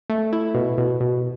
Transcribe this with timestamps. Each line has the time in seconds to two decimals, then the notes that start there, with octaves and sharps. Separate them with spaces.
0.10 A3
0.33 E4
0.54 B2
0.78 B2
1.00 B2